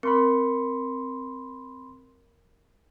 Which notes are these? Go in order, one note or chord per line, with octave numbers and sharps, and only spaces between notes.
C4 A#4 B5 C6 C#7